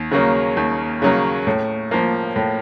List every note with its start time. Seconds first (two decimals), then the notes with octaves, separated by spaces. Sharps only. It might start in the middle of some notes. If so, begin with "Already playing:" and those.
Already playing: D#2
0.11 C#3 F#3 A#3
0.57 D#2
1.02 C#3 F#3 A#3
1.47 A2
1.91 F3 A#3
2.36 A2